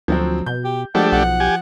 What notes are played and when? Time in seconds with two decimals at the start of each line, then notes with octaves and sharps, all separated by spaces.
0.08 D2 F3 F#3 C4
0.46 B2 G6
0.64 G4
0.95 F3 G#3 A3 D4 G4 F#5
1.12 B1 F#5
1.40 G4 G#5